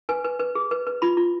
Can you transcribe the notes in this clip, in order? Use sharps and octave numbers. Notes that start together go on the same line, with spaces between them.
B4 G#5
B4
B4
G#4
B4
B4
F4 B5
F4